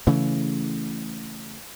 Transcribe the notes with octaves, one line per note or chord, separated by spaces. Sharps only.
C#3 E3 A3